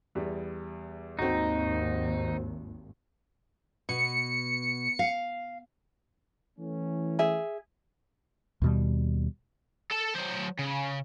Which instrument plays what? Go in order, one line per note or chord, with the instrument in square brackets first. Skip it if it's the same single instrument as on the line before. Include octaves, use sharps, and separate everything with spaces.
[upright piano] E2 G3
[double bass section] G#1 D#2 [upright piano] C4 F#4 [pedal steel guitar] D#4
[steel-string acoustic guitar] B2 [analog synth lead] C#7
[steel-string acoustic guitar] F5
[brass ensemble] E3 A3 C#4
[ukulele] G#4 E5
[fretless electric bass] D#2 B2 G3
[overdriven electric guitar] A4 A5
F#3 C5
C#3